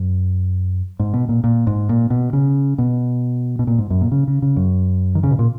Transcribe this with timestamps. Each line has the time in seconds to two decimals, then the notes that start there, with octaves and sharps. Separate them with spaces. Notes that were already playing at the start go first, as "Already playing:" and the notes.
Already playing: F#2
1.00 G#2
1.14 B2
1.29 A#2
1.44 A#2
1.67 G#2
1.89 A#2
2.10 B2
2.33 C#3
2.78 B2
3.59 B2
3.67 A#2
3.78 G#2
3.90 F#2
4.01 A#2
4.12 C#3
4.28 C#3
4.42 C#3
4.56 F#2
5.15 D#3
5.23 C#3
5.31 B2
5.39 A#2